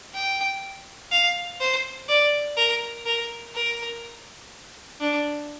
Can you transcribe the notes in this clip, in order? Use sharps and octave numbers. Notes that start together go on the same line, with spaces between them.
G5
F5
C5
D5
A#4
A#4
A#4
D4